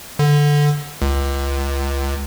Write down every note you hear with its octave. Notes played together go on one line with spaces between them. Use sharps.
D3
C#2